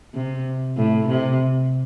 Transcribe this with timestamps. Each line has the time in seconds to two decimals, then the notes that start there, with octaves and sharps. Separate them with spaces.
0.14 C3
0.77 A2
1.07 C3